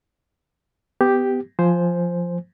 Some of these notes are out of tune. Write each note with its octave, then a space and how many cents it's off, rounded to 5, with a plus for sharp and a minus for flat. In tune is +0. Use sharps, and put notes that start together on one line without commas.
B3 +25 G4 +0
F3 +0 C5 +0 G#5 +5